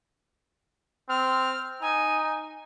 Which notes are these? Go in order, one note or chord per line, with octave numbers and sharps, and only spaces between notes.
C4 F6
D#4 G#5